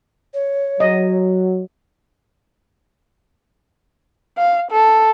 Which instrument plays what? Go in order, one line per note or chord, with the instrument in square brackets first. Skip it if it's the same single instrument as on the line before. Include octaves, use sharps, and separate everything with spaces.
[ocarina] C#5
[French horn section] F#3 [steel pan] D#5
[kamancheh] F5
A4